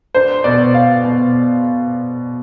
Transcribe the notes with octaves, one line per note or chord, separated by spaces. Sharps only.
D4 C5
B2 D5
B2 F5
B2